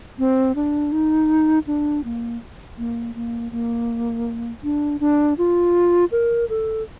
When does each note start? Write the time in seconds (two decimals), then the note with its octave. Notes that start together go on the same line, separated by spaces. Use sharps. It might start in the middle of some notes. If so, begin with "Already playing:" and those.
0.19 C4
0.56 D4
0.92 D#4
1.67 D4
2.04 A#3
2.78 A#3
3.15 A#3
3.52 A#3
4.64 D4
5.00 D4
5.38 F4
6.12 A#4
6.49 A4